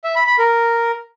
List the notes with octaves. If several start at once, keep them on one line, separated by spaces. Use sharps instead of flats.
E5
B5
B5
A#4